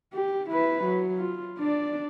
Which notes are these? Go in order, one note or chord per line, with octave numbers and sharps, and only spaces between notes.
G4
E4 B4
F#3
F4
D4 D5